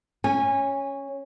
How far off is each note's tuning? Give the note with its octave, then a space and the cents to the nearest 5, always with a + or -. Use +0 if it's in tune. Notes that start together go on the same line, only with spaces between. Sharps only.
C#4 +0 G#5 -20